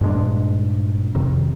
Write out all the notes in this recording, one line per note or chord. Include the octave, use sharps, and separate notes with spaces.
G2 A#2 G#3 D4
F2 C3 D#3